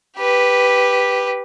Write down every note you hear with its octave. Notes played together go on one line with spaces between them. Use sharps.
G4 B4